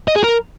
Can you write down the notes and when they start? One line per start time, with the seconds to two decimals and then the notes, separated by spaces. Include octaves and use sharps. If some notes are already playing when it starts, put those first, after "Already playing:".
0.08 D#5
0.16 G#4
0.24 A#4